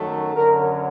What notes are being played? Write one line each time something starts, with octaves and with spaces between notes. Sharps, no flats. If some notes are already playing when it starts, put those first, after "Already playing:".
Already playing: F#2 D#3 F#3 A3
F#2 D3 F#3 A#4